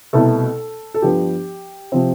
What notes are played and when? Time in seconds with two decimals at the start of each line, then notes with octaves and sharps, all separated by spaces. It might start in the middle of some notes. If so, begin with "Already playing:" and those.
0.13 C2 B2 A3 A4
0.94 A4
1.02 G2 F3 B3 D4 G4
1.92 C3 F3 C4